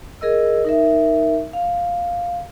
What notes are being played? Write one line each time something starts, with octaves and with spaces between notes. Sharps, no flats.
G#4 A#4 D#5 E6
D#4 A#4 E5
F5